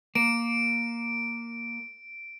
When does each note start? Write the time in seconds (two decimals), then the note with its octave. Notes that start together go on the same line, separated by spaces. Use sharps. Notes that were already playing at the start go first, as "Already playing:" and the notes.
0.15 A#3 D7